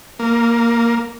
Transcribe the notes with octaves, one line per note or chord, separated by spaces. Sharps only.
A#3